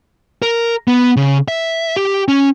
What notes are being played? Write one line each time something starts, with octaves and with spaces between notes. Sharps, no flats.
A#4
B3
C#3
E5
G4
C#4